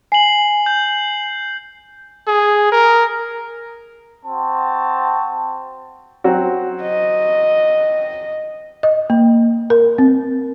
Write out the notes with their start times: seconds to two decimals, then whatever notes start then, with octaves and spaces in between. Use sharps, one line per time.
0.12 G#5 C7 F#7
0.66 G6
2.27 G#4
2.72 A#4
4.26 C4 F#4 A5
6.24 F#3 C4 F#4
6.82 D#5
8.83 D#5
9.10 A#3
9.70 A#4
9.98 C4